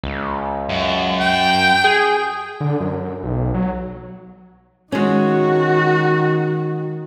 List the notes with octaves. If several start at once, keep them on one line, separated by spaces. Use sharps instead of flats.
C#2
F#2
G5
G#4
D3
F#2
B1
F#3
D#3 G#3 C#4 F#4